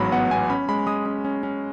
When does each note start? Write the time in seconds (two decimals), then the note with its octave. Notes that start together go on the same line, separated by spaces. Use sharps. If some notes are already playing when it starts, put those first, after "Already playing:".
Already playing: A1 G#2 F#3 B3 B5
0.12 B3 F#5
0.31 B3 G#5
0.50 C#4 B5
0.69 G#3 B5
0.87 G#3 D#6
1.06 C#4
1.25 C#4
1.43 C#4